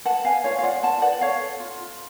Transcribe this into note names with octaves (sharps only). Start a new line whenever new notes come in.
B4 F#5 A5
B4 F5 G#5
F4 C#5 F5
F5
F4 D5 F#5
B4 F#5 A5
B4 D5 F#5
A4 C#5 F5
A4
F4
F4